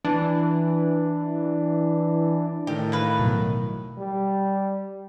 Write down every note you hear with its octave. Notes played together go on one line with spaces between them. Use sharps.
E3 D4
A2 D#3 G4
A#3 B4
B2 F#3
G3